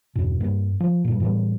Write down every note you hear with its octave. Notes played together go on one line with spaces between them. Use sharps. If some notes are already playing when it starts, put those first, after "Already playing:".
E2 G2 B2
G2 A#3
F3
G2 A#2
A2 E3 F3 G3